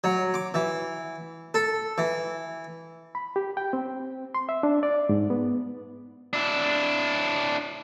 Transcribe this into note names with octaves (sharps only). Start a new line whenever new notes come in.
F#3
D6
E3
A4
E3
B5
G4
G5
C4
C6
E5
D4
D5
G#2
B3
D4 E4